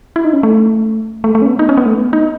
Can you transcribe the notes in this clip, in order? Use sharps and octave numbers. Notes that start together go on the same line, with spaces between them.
E4
D#4
C#4
A3
A3
A3
C#4
B3
D#4
C#4
B3
A3
B3
D#4